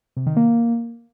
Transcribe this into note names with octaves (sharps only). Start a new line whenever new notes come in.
C3
D#3
A#3